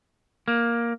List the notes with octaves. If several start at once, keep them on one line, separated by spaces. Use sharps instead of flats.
A#3